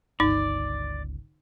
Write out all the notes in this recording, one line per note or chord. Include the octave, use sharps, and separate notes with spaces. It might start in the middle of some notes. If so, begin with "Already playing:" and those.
G1 C#2 D#4 D5